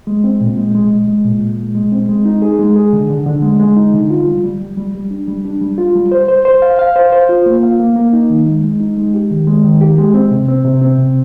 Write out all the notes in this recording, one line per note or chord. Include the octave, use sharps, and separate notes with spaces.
G#3
C4
A#2
G#3
G#3
G#3
G#3
A#2
A#2
G#3
G#3
C4
G#3
D#4
G#4
G#3
G#4
D3
D3
D3
G#3
G#3
D#4
D3
F4
G3
G3
G3
G3
G3
D4
G3
D4
G3
F4
G3
C5
C5
C5
F5
F5
C5
C5
F4
A#3
F5
A#3
A#3
D#4
D#3
G#3
G#3
D#4
G#3
G4
D#3
G#3
D#3
G4
G#3
C4
C3
C4
C3
C4
C3